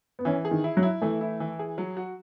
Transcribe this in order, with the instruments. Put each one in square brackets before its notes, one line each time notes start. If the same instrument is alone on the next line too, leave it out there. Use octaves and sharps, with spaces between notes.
[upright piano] B3
[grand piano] E3 [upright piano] C#4
[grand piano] G#4
[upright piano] D#3
[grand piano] E4
[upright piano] F#3
[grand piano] E4
[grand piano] E3 [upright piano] A3
[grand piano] E4
E3
G#4
F#3
F#4